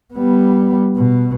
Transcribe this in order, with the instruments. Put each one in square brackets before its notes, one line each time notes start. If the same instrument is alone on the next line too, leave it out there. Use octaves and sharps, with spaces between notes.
[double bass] G3 B3
B2